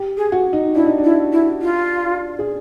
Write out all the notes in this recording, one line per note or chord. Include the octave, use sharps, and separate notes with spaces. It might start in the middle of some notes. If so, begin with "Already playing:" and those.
Already playing: G4
G#4
F#4
D#4
D4 E4
D#4
D4
E4
E4
F4
G#4